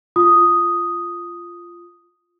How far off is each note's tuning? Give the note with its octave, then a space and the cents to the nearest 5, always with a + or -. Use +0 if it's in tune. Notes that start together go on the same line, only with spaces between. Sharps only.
F4 -10 D#6 +0